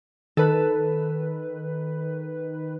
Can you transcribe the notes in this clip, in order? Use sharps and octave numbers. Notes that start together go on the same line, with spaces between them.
D#3 A4 B4